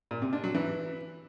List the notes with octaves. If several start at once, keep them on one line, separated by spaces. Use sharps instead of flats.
A#2
C3
D4
F#3
E3